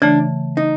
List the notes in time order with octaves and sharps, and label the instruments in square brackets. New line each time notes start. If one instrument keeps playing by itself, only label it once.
[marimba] C#3 E3 A3 [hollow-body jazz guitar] D4
[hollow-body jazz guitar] D#4